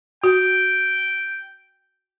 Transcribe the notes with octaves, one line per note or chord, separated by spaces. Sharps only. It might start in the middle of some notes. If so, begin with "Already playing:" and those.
F#4 G5